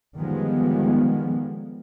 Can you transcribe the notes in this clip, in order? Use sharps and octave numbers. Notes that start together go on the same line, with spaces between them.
D3 D#3 F3 G3 G#3 B3